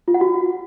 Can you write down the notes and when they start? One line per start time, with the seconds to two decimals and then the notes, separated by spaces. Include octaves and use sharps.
0.08 F4
0.14 F#5
0.21 F#4